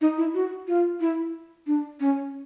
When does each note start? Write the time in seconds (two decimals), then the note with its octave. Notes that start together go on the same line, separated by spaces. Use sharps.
0.01 D#4
0.18 E4
0.34 F#4
0.68 F4
1.01 E4
1.67 D4
2.00 C#4